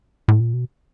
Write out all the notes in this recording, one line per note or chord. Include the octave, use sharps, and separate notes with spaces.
A2
A#2
B2